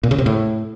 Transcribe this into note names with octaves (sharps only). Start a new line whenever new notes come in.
A#2
C#3
C3
A2